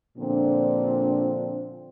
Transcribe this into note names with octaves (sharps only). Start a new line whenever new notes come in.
A#2 D3 F3 C4 D4